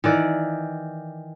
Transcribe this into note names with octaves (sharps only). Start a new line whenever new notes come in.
D#3 E3 D5 F#5